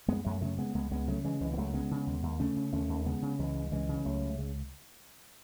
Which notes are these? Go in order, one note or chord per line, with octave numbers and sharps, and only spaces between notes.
F#2 G#3 B3
F#2 F#3 A3
C#3 F#3 A3
C#3 G#3 B3
C#2 G#3 B3
C#2 G#3 B3
C#3 F#3 A3
C#3 E3 G#3
C#2 E3 G#3
B3
C#2 F#3 A3
C#3 G#3 B3
C#3
D#2
D#2
C#3 A3 C#4
C#3
D#2 A3 C#4
D#2
C#3 G#3 B3
C#3
C#2 E3 G#3
C#2
C#3 E3 G#3
C#3
C#2 F#3 A3
C#2
C#3